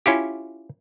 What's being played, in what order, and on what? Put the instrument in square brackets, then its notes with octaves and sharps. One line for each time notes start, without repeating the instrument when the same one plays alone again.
[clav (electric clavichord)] C#4 E4 F4 G4